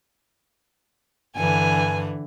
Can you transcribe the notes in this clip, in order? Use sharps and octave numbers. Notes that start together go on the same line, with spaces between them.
G2 D3 E3 G#5